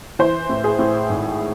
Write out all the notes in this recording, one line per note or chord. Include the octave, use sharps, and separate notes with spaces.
E3 C5
A2
G#4
A2
G#1